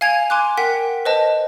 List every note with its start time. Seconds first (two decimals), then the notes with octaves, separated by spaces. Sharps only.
0.01 F5 G#5 G#6 D7 F7
0.30 G#5 C6 D6 F#6
0.57 A#4 F#5 G5 B6
1.05 B4 C5 D#5 A5